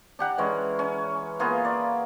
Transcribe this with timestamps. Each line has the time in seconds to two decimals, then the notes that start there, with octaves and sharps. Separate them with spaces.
0.19 D4 G4 F#5 A#5
0.38 E3 G#3 C#4
0.79 C#4
1.39 A#3 B3 F4 G#4
1.65 D5